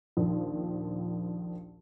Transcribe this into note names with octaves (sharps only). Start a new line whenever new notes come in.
A#1 D#2 F3